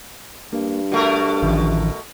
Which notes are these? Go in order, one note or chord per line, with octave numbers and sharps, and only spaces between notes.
G2 A#3
B2 A3 F#4 A#4
A1 D#3 F3